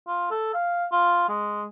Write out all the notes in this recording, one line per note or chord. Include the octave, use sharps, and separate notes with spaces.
F4
A4
F5
F4
G#3